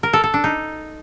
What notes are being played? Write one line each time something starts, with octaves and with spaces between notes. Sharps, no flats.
A#4
A4
A4
D4
D#4